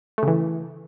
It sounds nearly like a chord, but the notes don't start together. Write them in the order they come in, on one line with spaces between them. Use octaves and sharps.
A3 C#3 E3